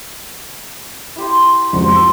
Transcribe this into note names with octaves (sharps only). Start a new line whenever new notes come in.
E4 G4 C6
F1 C#2 F#4 C5
E6